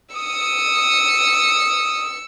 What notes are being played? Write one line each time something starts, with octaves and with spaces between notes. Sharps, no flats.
D#6 E6 C#7